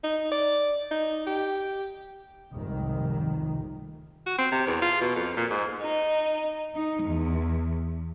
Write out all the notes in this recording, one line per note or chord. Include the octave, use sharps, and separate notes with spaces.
D#4
D5
D#4
G4
F1 C2 G#2 D#3
F#4
C4
C3
E2
F4
B2
F2
A#2
G#2
D#4
D#4
E2